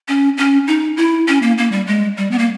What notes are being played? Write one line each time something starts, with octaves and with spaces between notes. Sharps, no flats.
C#4
C#4
D#4
E4
C#4
A#3
A#3
G3
G#3
G3
B3
A#3